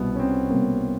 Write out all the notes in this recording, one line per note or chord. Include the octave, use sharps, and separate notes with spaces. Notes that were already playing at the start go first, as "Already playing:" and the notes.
Already playing: C2 B2 B3
C#4
C4
C2 B2 A#3